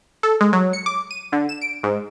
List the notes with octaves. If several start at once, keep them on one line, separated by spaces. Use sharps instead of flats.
A4
G#3
F#3
C#7
D6
D#7
D3
E7
D7
G#2